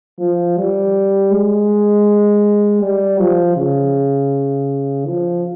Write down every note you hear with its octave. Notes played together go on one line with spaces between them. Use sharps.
F3
G3
G#3
G3
F3
C#3
F3